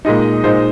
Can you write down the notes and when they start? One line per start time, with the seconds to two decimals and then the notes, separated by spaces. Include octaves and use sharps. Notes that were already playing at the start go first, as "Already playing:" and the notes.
0.05 A#2 G#3 D#4 D#5
0.44 A#2 G#3 D#4 C5